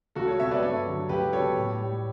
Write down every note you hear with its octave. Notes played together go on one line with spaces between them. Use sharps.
C#2 F#4 A4
A4 C#5
B2 G3 C#5 E5
B4 D5
G2 A4 C#5
D3 F#3
C#2 G4 B4
B2 F#3 A4 C#5
A2
G3